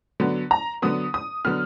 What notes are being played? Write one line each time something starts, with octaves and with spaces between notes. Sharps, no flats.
D3 F#3 B3
A#5
D3 F#3 B3 D#6
D#6
D3 F#3 B3 F6